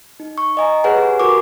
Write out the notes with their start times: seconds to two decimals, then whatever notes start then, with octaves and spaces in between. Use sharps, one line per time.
0.20 D#4
0.38 C#6
0.57 D#5 G#5 A#5
0.84 G#4 B4 C#5 F#5 G#5
0.97 G4
1.20 F#4 A#4 G#5 C#6 D6